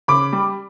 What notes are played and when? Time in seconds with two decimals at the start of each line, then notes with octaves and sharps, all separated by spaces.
0.08 C#3 B5 D6
0.33 G3